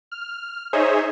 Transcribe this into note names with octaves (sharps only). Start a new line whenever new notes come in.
F6
D#4 G#4 C5 C#5 D#5 E5